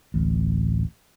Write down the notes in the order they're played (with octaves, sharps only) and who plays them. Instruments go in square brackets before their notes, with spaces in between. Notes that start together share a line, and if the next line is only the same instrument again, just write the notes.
[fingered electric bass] D1 A1